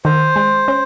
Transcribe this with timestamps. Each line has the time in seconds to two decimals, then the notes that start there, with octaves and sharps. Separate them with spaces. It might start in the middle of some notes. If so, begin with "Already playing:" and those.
0.04 D#3 C5
0.36 G#3
0.68 C#4